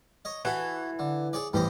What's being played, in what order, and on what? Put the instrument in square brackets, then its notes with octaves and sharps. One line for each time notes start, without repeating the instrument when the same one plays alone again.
[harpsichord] C#5 D#5
[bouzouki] E3 [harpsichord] F#4 A4
[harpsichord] D3
G#4 C#5 D5
[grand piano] A1 E3 G4 [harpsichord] G3 C5 D#5